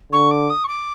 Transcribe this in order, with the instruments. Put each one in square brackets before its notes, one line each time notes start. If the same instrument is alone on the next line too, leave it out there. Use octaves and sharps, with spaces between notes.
[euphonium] D3 [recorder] C#6
[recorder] D6
D#6
C#6
D6